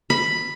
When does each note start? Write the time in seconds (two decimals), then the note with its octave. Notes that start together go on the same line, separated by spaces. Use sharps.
0.10 B5